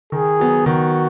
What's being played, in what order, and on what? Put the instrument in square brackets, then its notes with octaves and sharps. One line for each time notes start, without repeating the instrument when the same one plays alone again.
[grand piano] D#3 [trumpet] G#4
[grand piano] F#3 B3
[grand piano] D#3 [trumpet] F#4